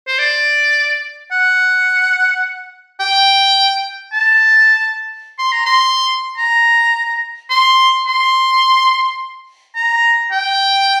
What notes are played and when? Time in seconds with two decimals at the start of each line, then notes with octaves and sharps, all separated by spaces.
0.08 C5
0.19 D5
1.32 F#5
3.00 G5
4.13 A5
5.39 C6
5.52 A#5
5.66 C6
6.38 A#5
7.50 C6
8.07 C6
9.76 A#5
10.32 G5